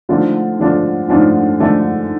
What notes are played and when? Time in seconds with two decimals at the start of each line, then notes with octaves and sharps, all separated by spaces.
0.09 D3 F3 A3 D4 F4
0.59 D3 F3 A3 D4 F4
1.09 D3 F3 A3 D4 F4
1.60 D3 F3 A3 D4 F4